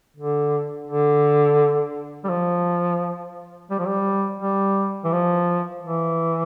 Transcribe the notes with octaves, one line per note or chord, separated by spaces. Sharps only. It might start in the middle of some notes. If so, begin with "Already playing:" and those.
D3
D3
G3
F3
G3
F3
G3
G3
E3
F3
E3